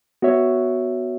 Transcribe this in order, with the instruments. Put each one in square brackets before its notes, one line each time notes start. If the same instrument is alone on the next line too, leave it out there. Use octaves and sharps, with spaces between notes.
[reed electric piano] B3 F#4 C#5 E5